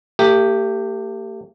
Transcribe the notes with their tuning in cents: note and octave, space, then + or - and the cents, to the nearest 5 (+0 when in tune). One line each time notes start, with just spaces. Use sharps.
A3 +45 G4 +0